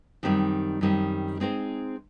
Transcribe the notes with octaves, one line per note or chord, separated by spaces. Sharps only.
F#2 D#3 G3 C4 D#4
F#2 D#3 G3 C4 D#4
G#3 C4 D#4 G#4 C5